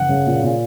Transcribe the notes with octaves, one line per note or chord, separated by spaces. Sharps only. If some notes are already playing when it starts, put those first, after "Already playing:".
Already playing: F#1 F#5
C#3
A#2
A#2